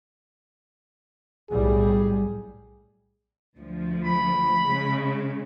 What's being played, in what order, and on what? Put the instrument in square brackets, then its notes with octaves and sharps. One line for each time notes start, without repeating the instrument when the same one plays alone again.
[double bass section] B1 A2 G3 [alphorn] G#4
[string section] D2 F3
[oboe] B5
[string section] C#3 G#3